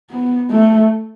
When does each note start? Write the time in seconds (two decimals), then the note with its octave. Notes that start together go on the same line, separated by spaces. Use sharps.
0.11 B3
0.51 A3